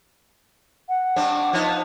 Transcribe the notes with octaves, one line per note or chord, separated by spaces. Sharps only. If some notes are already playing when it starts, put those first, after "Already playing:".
F#5
G2 C4 D4
F3 B3 D#4